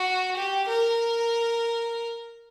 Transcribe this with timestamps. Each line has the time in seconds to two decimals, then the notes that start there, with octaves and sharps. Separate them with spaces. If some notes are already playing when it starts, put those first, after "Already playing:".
Already playing: F#4
0.37 G4
0.68 A#4